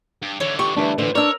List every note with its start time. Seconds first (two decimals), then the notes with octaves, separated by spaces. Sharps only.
0.22 G2
0.40 D3 E3 C#5
0.59 G4 C#6
0.76 D2 E3 G3 D4
0.98 A2 D3 E3 C5
1.15 D4 A#4 C#5 D5 E6